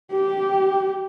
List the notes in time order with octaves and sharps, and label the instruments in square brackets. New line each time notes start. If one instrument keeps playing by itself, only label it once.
[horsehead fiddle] G4